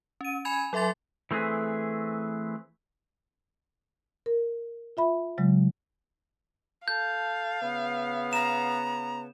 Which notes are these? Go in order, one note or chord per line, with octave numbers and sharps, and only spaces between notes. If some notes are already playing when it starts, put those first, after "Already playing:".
C#4 D#7
G#5 B5 G#6 F7
F#3 A4 E5 C6 A6
E3 A3 C4 G#4 B4
A#4
F4 E5 B5
C#3 F#3 G#3
A4 F5 A5 G6
C#3 B3
A#5 E7